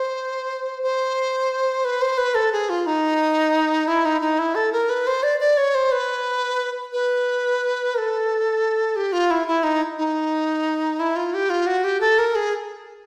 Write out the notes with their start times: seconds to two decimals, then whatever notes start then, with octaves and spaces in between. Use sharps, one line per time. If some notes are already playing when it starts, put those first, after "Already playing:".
Already playing: C5
0.83 C5
1.85 B4
2.01 C5
2.18 B4
2.35 A4
2.52 G#4
2.70 F4
2.86 D#4
3.88 E4
4.05 D#4
4.21 D#4
4.39 E4
4.55 A4
4.73 A#4
4.90 B4
5.07 C5
5.23 D5
5.40 D5
5.57 C#5
5.75 C5
5.92 B4
6.93 B4
7.94 A#4
7.98 A4
8.96 G4
9.13 F4
9.31 E4
9.47 E4
9.63 D#4
9.98 D#4
11.00 E4
11.16 F4
11.34 G4
11.50 F4
11.67 F#4
11.84 G4
12.01 A4
12.19 A#4
12.35 G#4